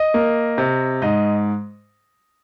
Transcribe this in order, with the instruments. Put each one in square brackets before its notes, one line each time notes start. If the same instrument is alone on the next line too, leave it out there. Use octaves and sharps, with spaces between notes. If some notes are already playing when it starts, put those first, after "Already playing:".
Already playing: [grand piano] D#5
A#3
C3
G#2 D#5